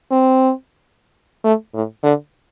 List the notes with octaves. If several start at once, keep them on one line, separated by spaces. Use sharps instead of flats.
C4
A3
A2
D3